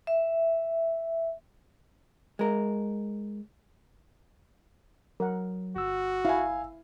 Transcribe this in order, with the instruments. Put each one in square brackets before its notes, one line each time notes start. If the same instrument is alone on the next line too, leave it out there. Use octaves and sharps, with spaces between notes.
[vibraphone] E5
[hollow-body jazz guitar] G#3 A#4
[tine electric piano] F#3 [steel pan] A#4 F#5
[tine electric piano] G1 E6 [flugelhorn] F#4
[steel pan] E4 [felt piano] F5 G#5